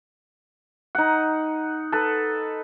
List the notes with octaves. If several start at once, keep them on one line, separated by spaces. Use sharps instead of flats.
D#4 F#5
A4 B4